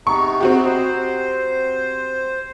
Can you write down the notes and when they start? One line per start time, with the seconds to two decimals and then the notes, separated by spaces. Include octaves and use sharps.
0.07 C3 B3 D#4 C#6
0.40 C4 F#4 G4
0.64 C5